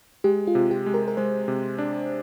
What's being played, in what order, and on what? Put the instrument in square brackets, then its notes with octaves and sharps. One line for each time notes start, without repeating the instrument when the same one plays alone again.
[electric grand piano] G#3 [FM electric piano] G4
[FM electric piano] F4
[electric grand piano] C3
[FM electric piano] G4
[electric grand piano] G#3
[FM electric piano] A#4
A#4
[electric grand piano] G#3 [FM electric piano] C5
[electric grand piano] C3
D4